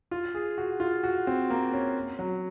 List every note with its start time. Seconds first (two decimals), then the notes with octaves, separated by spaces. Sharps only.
0.11 F4
0.34 G#4
0.58 F#4
0.80 F4
1.03 F#4
1.27 C4
1.50 A#3
1.73 C#4
2.19 F#3